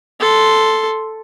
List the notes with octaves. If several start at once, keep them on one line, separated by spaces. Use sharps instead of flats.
A4 C6